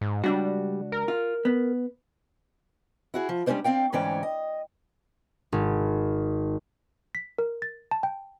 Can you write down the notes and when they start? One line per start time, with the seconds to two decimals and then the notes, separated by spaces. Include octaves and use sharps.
0.01 G#2
0.24 C#2 G3 D4 F#4
0.92 A#4
1.08 F4
1.45 B3
3.14 E4 F#4 G#4
3.29 F3
3.46 G3 G#3 C#4 D4 C5 D5
3.64 C4 D5 F5 G5
3.93 D2 G#2 E3 C#4 D5 G5
4.23 D#5
5.52 G#1
7.15 B6
7.38 A#4
7.62 A6
7.91 A5
8.03 G5